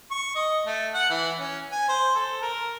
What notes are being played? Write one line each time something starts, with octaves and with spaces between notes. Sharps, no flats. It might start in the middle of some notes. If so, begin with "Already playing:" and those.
C#6
D#5
A3
F#5
E3
C#4
G#5
C5
A4
A#4